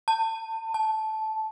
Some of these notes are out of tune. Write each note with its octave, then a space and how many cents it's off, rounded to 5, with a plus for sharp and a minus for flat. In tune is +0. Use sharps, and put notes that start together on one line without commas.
A5 +30
A5 -10